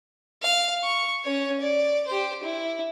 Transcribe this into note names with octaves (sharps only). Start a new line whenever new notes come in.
F5
C#6
C#4 C#5
D5
G4 C5
E4